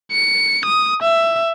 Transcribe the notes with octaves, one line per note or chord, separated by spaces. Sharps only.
C#7
D#6
E5